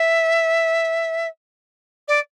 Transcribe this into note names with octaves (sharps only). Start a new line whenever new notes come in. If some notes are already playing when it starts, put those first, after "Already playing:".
Already playing: E5
D5